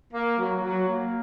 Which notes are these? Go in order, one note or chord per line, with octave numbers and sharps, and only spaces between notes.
A#3
F#3
F#3
A#3